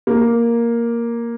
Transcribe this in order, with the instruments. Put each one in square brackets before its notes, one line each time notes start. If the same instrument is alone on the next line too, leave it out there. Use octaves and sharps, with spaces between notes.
[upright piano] A#3